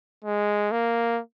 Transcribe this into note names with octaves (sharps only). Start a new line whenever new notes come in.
G#3
A#3